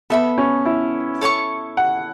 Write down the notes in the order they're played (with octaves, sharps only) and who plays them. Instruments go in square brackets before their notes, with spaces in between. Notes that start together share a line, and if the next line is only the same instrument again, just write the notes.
[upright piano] B3 [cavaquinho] A4 E5 B5
[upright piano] C#4
E4
[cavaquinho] A4 C#5 A5 C#6
[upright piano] F#5